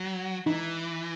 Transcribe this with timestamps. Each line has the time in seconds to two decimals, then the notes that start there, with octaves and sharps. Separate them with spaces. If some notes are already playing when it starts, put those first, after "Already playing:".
Already playing: F#3
0.46 E3 D#4